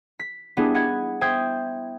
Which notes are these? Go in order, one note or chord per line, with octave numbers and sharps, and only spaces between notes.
B6
G3 B3 D4 E4 G#4
D#5 F#5 B5 G#6
C5 E5 G5 D#6 G6 G#6